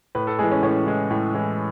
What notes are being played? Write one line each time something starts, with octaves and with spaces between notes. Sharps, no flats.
A2 B4
A4
E3 G#3 G#4
C#4
A2 C#4
E3 G#3
A2
E3 G#3